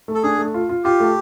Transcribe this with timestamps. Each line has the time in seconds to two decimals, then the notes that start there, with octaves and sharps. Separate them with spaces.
0.08 A3
0.15 A4
0.23 D4 G#4
0.38 A3
0.54 F4
0.69 F4
0.84 F4 G4
1.00 A3